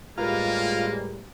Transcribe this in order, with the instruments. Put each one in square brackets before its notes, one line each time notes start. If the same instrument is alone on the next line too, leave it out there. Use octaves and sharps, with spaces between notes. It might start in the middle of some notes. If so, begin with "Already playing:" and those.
[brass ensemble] A2 G3 G#3 [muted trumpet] A#3 [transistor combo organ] F4 [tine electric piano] A#4 B4 A#5